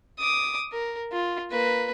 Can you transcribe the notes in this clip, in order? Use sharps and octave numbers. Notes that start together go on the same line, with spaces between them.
D6 D#6
A#4
F4
A#3 B4